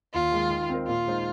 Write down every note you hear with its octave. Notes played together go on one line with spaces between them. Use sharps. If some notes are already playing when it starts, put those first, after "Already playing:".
D#2 F4
D#3 G#3
D#3
C4 D#4 A#4
A#2 F4
G#3 D#4 C5